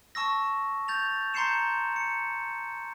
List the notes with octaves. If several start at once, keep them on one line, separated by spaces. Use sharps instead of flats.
A5 C#6 E6 A#6
G6 A6 F7
A#5 C6 G6 C7 C#7 E7
C#7